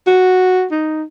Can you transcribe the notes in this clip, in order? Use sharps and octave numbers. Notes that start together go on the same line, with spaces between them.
F#4
D#4